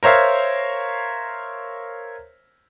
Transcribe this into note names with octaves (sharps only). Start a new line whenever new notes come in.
A#4 C5 C#5 E5 F5